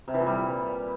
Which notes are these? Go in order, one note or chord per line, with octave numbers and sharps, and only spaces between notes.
C3
E3
A#2
G3